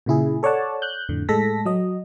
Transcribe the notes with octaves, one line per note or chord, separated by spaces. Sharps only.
A#2 C#3 E4 G#4
A4 C#5 D5 F#5 A5
F#6 G6
F2 A2 D3
A2 G#3 A4 A#6 B6
F#3 D#5